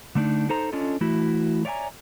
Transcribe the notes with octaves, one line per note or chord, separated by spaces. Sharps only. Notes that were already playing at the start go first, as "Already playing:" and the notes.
D3 A3 D4 D#4
D#4 A4 C5 A#5
C#4 D4 F4 A4 C#5 D#5
E3 A3 E4 F#4
C#5 D5 E5 G5 G#5 A#5